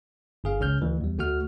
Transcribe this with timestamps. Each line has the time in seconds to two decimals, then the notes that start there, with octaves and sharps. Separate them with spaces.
0.44 G1 G#4 F5
0.60 C#2 C#3 C#4 F6 G6
0.81 D2 E3
1.01 E2 G3
1.18 D2 A3 F#4 F#5 F6